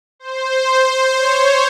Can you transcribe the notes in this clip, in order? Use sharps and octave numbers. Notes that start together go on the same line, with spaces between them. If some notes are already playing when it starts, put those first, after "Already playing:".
C5
C#5